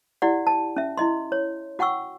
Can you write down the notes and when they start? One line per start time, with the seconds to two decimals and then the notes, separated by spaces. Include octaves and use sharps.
0.22 E4 G4 D5 F#5
0.47 A5
0.76 C#4 E5
0.97 E4 D#5 C6
1.32 C#5
1.79 F#4 F#5 G5 C#6 E6